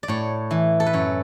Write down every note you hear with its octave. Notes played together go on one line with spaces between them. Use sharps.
D5
A2 C#5
E3
A4
B4
F#2 C#5